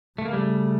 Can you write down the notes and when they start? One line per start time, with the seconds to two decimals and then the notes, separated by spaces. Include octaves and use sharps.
0.18 C#3 A3
0.25 A#3
0.33 G3 A3